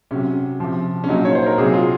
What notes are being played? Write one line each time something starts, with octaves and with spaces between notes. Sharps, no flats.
C3 F#3 C#4
C3 F3
C#4
A#2 F#3 D#4
C#5
C5
A#4
C3 F#3 G#4
F4